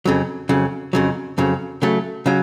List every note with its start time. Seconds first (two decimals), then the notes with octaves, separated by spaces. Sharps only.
0.05 F2 C#3 F#3
0.49 F2 C#3 F#3
0.93 F2 C#3 F#3
1.38 F2 C#3 F#3
1.82 C#3 F#3 A3
2.26 C#3 F#3